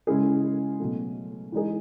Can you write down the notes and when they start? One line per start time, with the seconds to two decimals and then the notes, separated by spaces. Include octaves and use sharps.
0.07 C#3 G#3 C#4 E4 G#4
0.79 B2 F#3 A3
1.52 E3 G#3 D#4 G#4